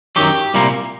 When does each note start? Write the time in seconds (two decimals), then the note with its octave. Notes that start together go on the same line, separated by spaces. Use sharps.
0.16 F#2 D#3 F#3 G4
0.54 C2 A#2 G3 A#3